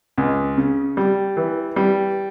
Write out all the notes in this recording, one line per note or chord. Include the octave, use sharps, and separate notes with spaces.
C#2
C#3
G3
E3
G3